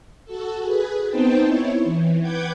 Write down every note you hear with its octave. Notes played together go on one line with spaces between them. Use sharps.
F#4 A4
G#4 B4
B3 C4 D#4 C5 G5 A5
E4 C#5
E3
B4 F#5 G5 D6 G6 G#6